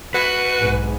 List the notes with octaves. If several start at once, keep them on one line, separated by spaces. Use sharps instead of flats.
F#4 B4
B1 G#2 B3